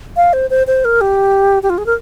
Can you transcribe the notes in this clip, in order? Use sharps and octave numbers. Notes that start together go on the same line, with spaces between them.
F5
C5
C5
C5
A#4
G4
G4
F4
G#4
A#4